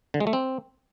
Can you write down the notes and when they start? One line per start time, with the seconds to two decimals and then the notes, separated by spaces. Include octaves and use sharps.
0.14 D3
0.20 G#3
0.27 A3
0.33 C4